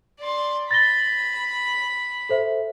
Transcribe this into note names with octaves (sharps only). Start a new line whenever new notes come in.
D5 C6
B5 A6 A#6 G7
A4 C5 E5